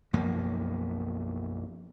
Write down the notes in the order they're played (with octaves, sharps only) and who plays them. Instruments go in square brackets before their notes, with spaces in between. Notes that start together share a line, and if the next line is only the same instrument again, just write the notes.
[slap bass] B1 F#2 F3 A#3